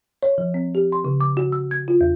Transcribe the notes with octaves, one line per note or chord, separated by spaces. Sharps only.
C#5
F3
C4
G4
C6
C#3
D6
F#4
E6
G#6
F4
E2